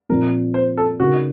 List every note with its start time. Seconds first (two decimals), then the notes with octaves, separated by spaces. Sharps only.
0.09 A#2 F3 C4 A#4
0.54 C5
0.77 A4
1.00 C#3 A3 D#4 F#4 A#4